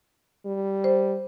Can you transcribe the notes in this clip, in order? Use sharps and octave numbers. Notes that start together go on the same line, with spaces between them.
G3
C5